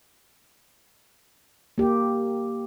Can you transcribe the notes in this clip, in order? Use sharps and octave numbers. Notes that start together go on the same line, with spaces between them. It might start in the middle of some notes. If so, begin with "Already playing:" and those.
A#3 G4